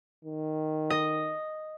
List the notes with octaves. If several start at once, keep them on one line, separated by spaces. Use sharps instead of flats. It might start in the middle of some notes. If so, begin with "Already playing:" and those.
D#3
D#5